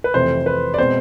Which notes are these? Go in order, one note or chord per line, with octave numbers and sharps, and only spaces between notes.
B4
F2 C3 E3 A3 E4 C5
B4
D5
B2 G#3 C4 C5